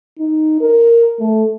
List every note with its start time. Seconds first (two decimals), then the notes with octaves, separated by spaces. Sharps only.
0.19 D#4
0.61 A#4
1.19 A3